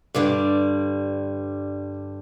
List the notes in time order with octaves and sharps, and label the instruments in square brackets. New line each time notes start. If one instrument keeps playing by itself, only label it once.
[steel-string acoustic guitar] G2 D3 G3 D5